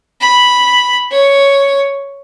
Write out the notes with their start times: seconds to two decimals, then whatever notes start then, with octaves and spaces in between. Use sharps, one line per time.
0.21 B5
1.11 C#5